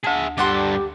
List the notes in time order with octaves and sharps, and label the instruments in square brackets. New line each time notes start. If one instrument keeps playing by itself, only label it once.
[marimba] D2 A5 [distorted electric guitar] G#4 E5
[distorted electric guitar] G2 A4 [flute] G4 [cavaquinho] D5 F#5 C6